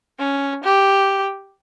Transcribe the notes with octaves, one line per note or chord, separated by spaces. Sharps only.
C#4
G4